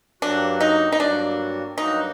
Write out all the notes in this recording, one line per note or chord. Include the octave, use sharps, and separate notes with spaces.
G2 F#3 A#3 D4 F#4
D#4
D#4
G2 F#3 A#3 D4 F#4
G2 F#3 A#3 D#4 F#4